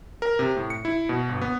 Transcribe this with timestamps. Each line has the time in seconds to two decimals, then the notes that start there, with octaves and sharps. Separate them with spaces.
0.22 A#4
0.39 C3
0.56 A2
0.70 C#7
0.85 E4
1.09 B2
1.29 G1
1.41 B3